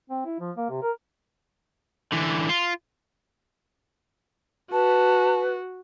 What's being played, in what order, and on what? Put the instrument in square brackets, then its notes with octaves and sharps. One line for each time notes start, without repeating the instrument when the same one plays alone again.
[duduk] C4
E4
F3
A#3
C3
A#4
[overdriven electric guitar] D3 E3
F4
[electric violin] F#4 [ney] B4 [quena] A5